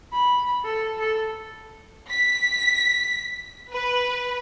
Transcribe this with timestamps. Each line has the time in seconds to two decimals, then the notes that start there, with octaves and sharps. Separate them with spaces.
0.13 B5
0.64 A4
0.99 A4
2.11 B6
3.72 B4